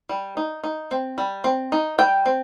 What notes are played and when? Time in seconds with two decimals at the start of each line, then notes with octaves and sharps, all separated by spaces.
0.09 G3
0.37 D#4
0.64 D#4
0.91 C4
1.18 G3
1.44 C4
1.72 D#4
1.98 G3 G5
2.26 C4